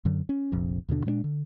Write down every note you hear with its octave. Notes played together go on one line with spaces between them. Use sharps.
F#2 D3 F#3
C#4
F1 A#1 F2
D#2 B2 D3 D4
A#2 G#3 B3 D4
D3